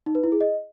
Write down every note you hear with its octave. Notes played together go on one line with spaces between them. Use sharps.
D#4
B4
E4
G#4
D#5